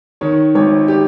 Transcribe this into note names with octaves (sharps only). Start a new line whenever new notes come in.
D#3 C#5
G#1 C#5
G4